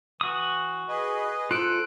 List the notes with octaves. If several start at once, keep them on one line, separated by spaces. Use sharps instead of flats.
E3 F#4 D#6
G#4 B4 D#5
F4 A4 C5 F#6 D7